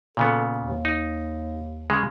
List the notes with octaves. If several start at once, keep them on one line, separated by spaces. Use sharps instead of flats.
A#2 C#3 B3 A4
D#2
D#4
C#3 G#3